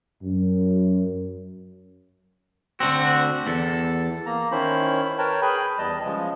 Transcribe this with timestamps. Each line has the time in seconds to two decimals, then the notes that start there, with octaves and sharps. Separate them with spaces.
0.23 F#2
2.80 D2 D3 C4 F#4
3.47 E2 A4
4.26 A#3 A#5
4.51 D#3 C#4 E4 C5 B5
5.18 A#4 B4 C#5 G5 A5
5.42 G#4 B4 G5 G#5 B5
5.78 E2 G3 D#5 A5
6.05 C#3 F3 G#3